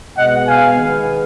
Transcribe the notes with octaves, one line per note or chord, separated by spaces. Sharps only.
B2 G#3 B3 D#5 F#5
F5 G#5
D#3 G#3 B3